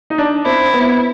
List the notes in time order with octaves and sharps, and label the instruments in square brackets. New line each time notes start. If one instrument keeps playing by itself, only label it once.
[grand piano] D#4
D4
[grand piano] C4 [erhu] E4
[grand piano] B3